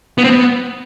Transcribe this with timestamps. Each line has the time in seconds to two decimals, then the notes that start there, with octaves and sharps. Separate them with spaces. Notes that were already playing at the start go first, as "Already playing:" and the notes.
0.18 B3
0.24 C4
0.30 B3